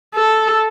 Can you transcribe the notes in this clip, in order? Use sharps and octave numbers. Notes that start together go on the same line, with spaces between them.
A4